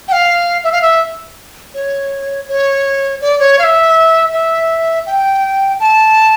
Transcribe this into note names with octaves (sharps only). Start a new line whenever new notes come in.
G5
F5
E5
F5
E5
C#5
C#5
D5
C#5
F5
E5
E5
G5
A5